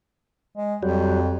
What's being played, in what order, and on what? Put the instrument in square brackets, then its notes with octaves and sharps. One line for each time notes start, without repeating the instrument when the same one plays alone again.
[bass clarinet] G#3
[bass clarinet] F2 [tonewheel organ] F#3 G3